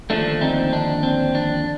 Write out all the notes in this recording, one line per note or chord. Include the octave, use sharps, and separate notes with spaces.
D#2 D3 F3 A3 D4
C4 D#4
D4
C4
D4